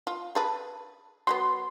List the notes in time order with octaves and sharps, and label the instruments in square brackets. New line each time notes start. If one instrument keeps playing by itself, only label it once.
[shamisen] F4
G#4 A4 B4
[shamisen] F#3 G3 B3 [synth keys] C6